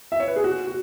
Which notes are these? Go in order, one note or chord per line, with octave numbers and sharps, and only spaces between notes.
E5
C#5
B4
G#4
F#4
F#4